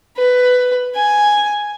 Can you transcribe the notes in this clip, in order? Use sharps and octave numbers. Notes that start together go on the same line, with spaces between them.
B4
G#5